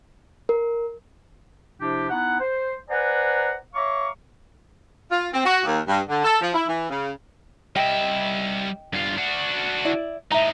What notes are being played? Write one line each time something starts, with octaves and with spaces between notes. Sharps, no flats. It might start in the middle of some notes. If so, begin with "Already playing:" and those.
A#4
C3 F3 D4 E4 G4
B3 D#4 E4 F#5
C5
B4 C5 D5 F#5 G#5 A#5
C#5 E5 F5 A#5 C#6 D6
F4
C4
F#4
D#2
G2
D3
A4
F3
E4
E3
C#3
G3 D#5 E5 G5
G2 F4
D4 F#4
E4 D5
A2 D#4 E5 A#5